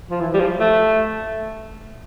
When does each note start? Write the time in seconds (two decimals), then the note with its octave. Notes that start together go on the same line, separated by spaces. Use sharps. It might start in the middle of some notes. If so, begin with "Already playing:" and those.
0.11 F3
0.20 E3
0.34 G3
0.40 F3
0.60 A3